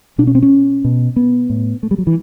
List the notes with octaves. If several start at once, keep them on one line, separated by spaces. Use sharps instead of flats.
B2 D4
C#4
C4
C#4
B2
B3
A2
A3
G3
F#3
E3